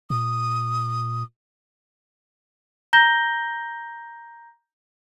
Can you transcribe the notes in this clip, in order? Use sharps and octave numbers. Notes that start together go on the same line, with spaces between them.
A#2 D#6
A#5 G6 A#6 G7